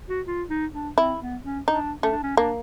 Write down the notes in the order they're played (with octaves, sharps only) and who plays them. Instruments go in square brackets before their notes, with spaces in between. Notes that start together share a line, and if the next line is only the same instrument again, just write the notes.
[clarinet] F#4
F4
D#4
D4
[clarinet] C4 [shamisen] E4
[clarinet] B3
C#4
[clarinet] D4 [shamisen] D#4
[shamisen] A3 [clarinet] C#4
[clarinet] D4
C#4
[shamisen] A#3 [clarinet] D4